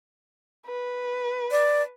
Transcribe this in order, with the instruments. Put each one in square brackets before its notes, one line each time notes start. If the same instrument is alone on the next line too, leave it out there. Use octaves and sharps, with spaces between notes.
[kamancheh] B4
[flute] D5